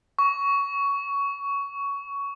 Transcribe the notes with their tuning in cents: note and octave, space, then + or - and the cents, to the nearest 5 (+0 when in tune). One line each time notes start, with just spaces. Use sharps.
C#6 +15